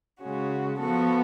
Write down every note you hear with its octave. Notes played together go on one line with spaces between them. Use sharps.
C#3 G#3 C#4 F#4
F3 B3 F#4 A4